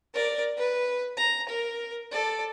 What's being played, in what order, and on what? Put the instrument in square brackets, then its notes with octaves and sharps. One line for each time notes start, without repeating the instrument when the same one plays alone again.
[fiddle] A#4 D5
B4
A#5
A#4
A4 D5